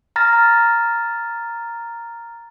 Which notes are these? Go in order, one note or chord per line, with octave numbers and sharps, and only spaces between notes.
A#5 F6 A6 A#6